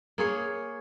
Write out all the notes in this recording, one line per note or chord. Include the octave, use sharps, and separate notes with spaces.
A#3 G#4 C#5